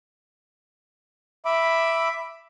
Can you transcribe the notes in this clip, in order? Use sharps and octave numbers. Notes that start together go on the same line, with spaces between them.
E5 B5 D6